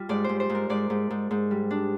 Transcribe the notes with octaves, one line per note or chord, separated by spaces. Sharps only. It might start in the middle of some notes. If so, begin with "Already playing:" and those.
Already playing: G3 F4
G#2 D5
G#2 C5
C5
G#2
A#4
G#2 D5
G#2
G#2
G#2
G3
D4